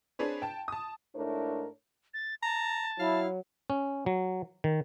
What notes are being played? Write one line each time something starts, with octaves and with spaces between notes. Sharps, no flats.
C4 D4 G#4 B4 C#5
G5 A5
A5 D#6
G#2 A3 D4 E4 A#4 C#5
A6
A5 A#5
F#3 E4 F5
C#4
F#3
D#3